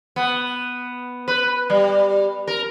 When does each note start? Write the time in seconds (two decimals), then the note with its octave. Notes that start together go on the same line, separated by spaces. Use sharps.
0.16 B3
1.28 B4
1.70 G3
2.48 A#4